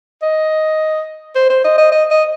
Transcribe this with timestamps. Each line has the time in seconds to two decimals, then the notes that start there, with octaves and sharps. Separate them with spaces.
0.22 D#5
1.35 C5
1.50 C5
1.64 D#5
1.78 D#5
1.92 D#5
2.11 D#5